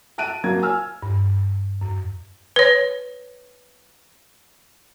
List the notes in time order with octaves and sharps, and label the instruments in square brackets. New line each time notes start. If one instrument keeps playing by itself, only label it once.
[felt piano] E5 A5 F#6 D7 D#7
F#3 A#3 G#6
G#5 E6 F6
[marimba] G2
F#2
[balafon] B4 C#5